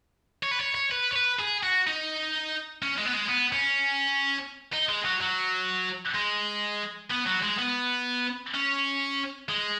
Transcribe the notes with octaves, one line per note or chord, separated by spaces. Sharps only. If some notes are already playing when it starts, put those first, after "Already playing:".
C#5
B4
C#5
C#5
B4
C#5
B4
G#4
F#4
D#4
C#4
G#3
B3
G#3
B3
C#4
D#4
G#3
F#3
F#3
G#3
B3
F#3
G#3
B3
C#4
G#3